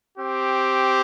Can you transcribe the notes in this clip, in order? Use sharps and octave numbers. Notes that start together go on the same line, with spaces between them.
C4 G4